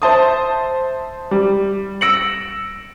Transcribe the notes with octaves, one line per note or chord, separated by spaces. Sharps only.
C5 E5 A5 C6 D#6
G3
E6 A#6 C#7 D7 F#7